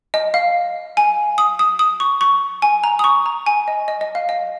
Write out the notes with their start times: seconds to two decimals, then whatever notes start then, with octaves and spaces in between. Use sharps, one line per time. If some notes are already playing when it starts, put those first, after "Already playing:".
0.14 D#5
0.34 F5
0.97 G#5
1.38 D#6
1.59 D#6
1.79 D#6
2.00 C#6
2.21 C#6
2.62 G#5
2.84 A#5
2.99 D#6
3.04 C#6
3.26 A#5
3.46 G#5
3.68 D#5
3.88 D#5
4.01 D#5
4.15 F5
4.29 D#5